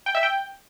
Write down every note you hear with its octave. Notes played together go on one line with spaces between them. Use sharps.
G5
E5
G5